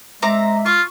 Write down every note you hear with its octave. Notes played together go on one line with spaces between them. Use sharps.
G#3 C4 E5 A#5 D6
F4 C#6